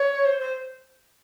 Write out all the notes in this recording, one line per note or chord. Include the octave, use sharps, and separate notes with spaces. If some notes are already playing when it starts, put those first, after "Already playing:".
Already playing: C#5
C5
C5